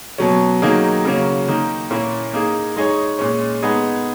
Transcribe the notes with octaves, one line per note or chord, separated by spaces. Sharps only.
B2 F#3 C#4
D#3 F#3 A#3 D#4 G#4
C#3 F#3 A#3 C#4
D#3 A#3 D#4
A#2 A#3 C#4 E4
A#3 D#4 G#4
G#3 D#4 G#4 C#5
A#2 G#3 C#4
G#3 B3 D#4 G#4